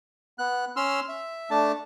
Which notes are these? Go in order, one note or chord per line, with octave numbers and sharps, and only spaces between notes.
B3 F#6
C#4 C6 E6 F6
E5
A3 D4 A5